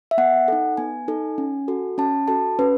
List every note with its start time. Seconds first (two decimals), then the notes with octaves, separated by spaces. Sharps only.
0.11 E5
0.18 B3 F#5
0.48 D#4 A4
0.77 B3 G#5
1.08 D#4 A4
1.38 C#4
1.68 F#4 A4
1.98 C#4 A5
2.28 F#4 A4 A5
2.59 C#4 B4